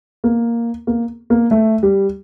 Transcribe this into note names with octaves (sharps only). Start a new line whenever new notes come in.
A#3
A#3
A#3
A3
G3